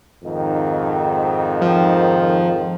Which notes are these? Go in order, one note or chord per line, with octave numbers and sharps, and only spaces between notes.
F2 G#2 D#3
F3